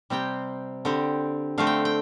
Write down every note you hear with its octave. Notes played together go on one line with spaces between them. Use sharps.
C3 G3 C4 G5
D3 G3 C4
D3 A3 C4 F5
G5
G5